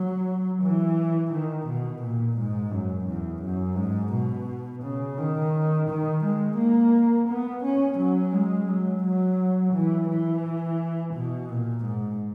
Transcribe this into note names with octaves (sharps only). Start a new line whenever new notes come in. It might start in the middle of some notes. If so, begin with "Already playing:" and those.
Already playing: F#3
E3
D#3
B2
A#2
G#2
F#2
E2
F#2
G#2
B2
C#3
D#3
D#3
G#3
A#3
B3
C#4
F#3
G#3
F#3
F#3
E3
E3
B2
A#2
G#2